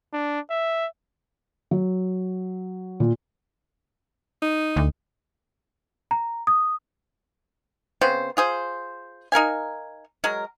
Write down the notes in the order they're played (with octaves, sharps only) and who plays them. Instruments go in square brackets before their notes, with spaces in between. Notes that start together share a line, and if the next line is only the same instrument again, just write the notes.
[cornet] D4
E5
[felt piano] F#3
A#2
[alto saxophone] D#4
[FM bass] D2
[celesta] A#5
D#6
[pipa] C#3 B3 C4 C5
F4 G#4 C5
D#4 A#4 F5 G#5
F#3 G#3 A#4